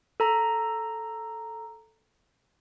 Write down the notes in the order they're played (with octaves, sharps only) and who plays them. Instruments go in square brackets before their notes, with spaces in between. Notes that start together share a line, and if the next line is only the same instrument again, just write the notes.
[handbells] A4 A#5